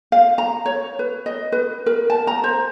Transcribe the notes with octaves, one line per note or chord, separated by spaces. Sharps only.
F5
A#5
C#5
B4
D#5
B4
A#4
A5
A#5
C5